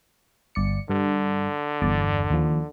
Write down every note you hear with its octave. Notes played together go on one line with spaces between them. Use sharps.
G1 D5 C#7
G2 D3
G1 E2 D5
D#2 F3